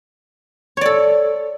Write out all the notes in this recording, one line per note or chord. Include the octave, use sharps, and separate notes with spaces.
A4 C#5 D5